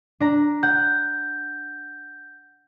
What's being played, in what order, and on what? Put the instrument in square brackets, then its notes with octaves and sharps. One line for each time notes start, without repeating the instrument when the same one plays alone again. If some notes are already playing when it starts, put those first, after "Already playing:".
[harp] D4 A#5
[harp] F#5 [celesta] G6